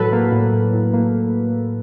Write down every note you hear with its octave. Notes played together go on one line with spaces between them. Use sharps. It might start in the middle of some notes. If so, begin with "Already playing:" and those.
Already playing: A2 F#3 A4 B4
A#3
A2
A2
A2
A#3